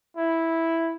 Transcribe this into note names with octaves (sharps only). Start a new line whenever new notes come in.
E4